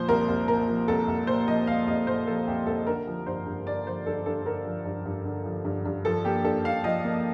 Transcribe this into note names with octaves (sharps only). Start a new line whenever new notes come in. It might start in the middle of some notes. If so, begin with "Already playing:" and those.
Already playing: A#2 F3 C5
C2 A#4
C2
A#2 A#4
F3
C2 A4
C2
A#2 C5
F3 D#5
C2 F5
C2 D#5
A#2 C5
F3 A4
C2 G4
C2 A4
D3 A#4
F3
G2 C5
G2
D3 D5
F3 C5
G2 A4
G2 A4
D3 A#4
F3
G2
G2
D3
F3
G2
G2
F3 A4
A#3 G4
G2 A4
G2 F5
F3 D#5
A#3